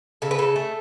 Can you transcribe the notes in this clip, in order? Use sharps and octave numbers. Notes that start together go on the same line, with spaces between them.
C#3 A4
B4
C#3 A4
A3